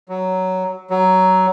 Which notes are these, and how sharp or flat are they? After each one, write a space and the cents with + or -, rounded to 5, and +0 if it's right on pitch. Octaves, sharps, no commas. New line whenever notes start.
F#3 +10
F#3 +15